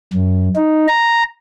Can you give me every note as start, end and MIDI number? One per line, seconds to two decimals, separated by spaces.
0.13 0.49 42
0.56 0.87 63
0.88 1.23 82